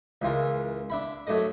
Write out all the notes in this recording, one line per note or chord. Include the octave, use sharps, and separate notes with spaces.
C#2 E3 F4 A#4
D4 E5 B5
F#3 A3 D4 A4 D#5